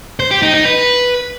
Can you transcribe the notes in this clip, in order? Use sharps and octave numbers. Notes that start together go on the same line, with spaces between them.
C5
G4
D#4
D#4
B4